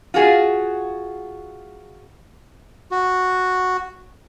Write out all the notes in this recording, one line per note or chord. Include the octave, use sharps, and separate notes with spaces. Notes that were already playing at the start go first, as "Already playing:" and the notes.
F4 F#4 G#4
F#4